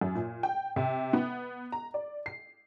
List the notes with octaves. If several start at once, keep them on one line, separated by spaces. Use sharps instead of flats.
F#2
A#2
G5
C3
B3
A#5
D5
C7